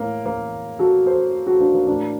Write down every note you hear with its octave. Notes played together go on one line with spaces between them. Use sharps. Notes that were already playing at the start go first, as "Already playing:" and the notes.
Already playing: A2 A#3
A#3
F#4 A4
A4 C5
F#4 A4
A#3 D4
A#3
A2 A#3 D4